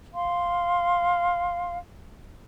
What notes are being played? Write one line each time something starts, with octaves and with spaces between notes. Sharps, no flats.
F5 C6